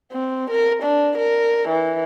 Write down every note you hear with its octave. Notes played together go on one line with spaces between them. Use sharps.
C4
A#4
D4
A#4
E3